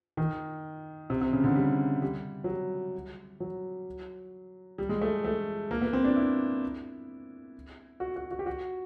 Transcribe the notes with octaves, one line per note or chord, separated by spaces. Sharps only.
D#3
C3
C3
C#3
D3
G3
G3
F#3
G3
F#3
G3
G#3
A3
A3
A#3
B3
C4
D4
E4
F#4
F#4
F#4
G4
F#4